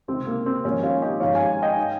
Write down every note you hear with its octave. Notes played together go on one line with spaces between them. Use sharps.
C#2 C3 D#3 C4
A#3
C4
G#1 G#2 F3 A#3 C#4
C#4 F4
D#4 G4
G#1 G#2 F3 C#5 F5
F5 G#5
D#5 G5
D#3